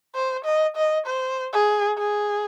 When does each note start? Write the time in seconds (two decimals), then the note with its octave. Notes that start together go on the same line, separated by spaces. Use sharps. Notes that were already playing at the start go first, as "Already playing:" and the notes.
0.15 C5
0.45 D#5
0.76 D#5
1.07 C5
1.53 G#4
1.98 G#4